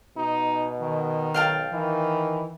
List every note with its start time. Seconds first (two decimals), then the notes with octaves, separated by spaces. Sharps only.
0.17 B2 D#4
0.81 D#3
1.34 B1 F5 G5 A5
1.72 D#3 E3